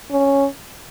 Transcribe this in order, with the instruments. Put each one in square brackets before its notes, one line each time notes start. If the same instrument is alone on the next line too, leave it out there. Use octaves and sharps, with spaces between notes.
[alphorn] C#4